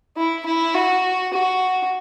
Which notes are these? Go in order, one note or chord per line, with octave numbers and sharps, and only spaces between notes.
E4
E4
F#4
F#4